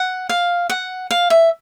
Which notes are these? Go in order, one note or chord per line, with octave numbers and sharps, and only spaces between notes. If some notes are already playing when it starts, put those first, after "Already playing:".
Already playing: F#5
F5
F#5
F5
E5